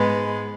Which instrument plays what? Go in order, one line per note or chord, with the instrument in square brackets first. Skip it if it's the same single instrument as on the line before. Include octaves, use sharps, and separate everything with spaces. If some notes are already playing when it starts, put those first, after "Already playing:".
Already playing: [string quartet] G#2 G#3 B3